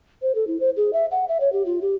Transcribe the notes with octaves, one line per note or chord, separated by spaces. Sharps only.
C5
A4
E4
C5
G#4
E5
F#5
E5
C#5
G4
F4
G4